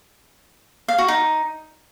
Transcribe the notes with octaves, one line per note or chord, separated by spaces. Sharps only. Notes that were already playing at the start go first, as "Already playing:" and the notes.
F5
F#4
D#4